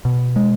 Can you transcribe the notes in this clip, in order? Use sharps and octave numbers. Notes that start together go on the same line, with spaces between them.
B2
G#3